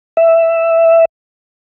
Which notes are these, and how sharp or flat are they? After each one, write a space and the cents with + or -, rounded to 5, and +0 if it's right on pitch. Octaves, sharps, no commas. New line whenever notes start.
E5 +5